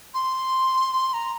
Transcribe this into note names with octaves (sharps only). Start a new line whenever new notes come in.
C6
A#5